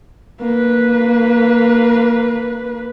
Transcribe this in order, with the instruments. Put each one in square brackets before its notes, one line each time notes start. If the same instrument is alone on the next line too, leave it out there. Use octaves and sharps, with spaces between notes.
[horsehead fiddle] A#3 B4